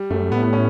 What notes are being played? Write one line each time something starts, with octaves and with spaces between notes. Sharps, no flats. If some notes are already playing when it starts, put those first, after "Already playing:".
Already playing: G3
F#2 A3
A2 B3
B3
C#4